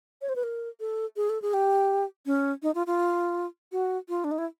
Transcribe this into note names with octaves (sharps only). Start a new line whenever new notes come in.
C#5
C5
B4
A#4
A4
G#4
A4
G#4
G4
C#4
D#4
F4
F4
F#4
F4
D4
D#4
E4